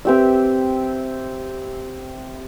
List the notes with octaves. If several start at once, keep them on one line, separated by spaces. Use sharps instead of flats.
C4 G4 E5